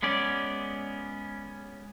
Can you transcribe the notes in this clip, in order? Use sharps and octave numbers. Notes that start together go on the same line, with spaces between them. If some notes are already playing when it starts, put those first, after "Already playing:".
G#3 B3 C#4 D5